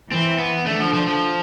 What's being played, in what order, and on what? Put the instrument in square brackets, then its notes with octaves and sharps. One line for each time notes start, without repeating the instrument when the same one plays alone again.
[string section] E3 [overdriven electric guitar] C4
[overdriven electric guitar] B3
[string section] D3 [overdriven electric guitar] A3
[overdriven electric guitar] F3
F3
F3